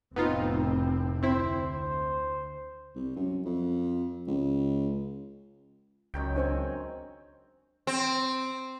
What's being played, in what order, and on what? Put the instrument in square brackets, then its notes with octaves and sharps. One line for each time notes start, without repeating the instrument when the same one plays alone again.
[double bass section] F1 A2 C4 [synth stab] B3 D#4 F4
[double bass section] D2 [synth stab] C4 E4 [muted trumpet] C5
[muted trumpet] C5
[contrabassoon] C2
F#2
F2
C#2
[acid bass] C#2 [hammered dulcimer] F#2 D#3 G5
[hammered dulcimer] C4 C#5 G#5 [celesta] D4 C5
[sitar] C4